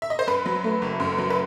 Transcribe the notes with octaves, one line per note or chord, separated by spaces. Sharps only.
E5
D#5
C5
F#2 B4
F#3
A3
F#1
F#2
F#3
B4